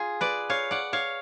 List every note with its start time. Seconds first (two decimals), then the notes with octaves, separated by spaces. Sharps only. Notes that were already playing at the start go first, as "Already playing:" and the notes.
Already playing: F4 G#4
0.21 B4 D5
0.50 C#5 F5
0.71 D5 F#5
0.93 C#5 F5